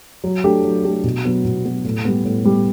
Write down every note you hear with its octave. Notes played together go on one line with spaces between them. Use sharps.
F#3
A3 D4 G4
F#3
A3 D4 G4
B2
F#3 B3 F#4
B2
F#3 B3 F#4
A2
G3 B3
A2
G3 B3